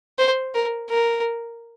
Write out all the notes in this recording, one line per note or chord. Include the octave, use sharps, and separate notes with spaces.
C5
A#4
A#4